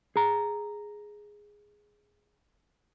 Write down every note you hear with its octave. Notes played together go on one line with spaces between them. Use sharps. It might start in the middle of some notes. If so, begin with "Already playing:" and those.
G#4 A#5